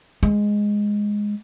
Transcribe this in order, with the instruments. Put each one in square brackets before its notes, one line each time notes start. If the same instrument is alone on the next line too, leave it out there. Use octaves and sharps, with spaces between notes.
[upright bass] G#3